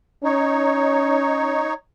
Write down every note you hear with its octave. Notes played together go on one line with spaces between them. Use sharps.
C#4 D#4 C#5